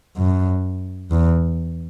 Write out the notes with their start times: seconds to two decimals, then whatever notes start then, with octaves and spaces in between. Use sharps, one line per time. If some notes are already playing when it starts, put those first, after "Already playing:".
0.17 F#2
1.11 E2